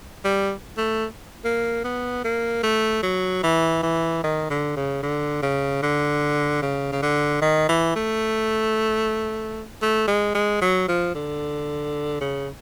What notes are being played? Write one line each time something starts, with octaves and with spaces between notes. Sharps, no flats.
G3
A3
A#3
B3
A#3
A3
F#3
E3
E3
D#3
D3
C#3
D3
C#3
D3
C#3
C#3
D3
D#3
E3
A3
A3
G#3
G#3
F#3
F3
D3
C#3